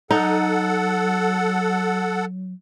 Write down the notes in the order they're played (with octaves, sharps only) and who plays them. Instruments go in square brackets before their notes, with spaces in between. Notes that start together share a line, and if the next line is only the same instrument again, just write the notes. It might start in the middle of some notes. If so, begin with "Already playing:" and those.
[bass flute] F#3 [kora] D#4 [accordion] A4 F#5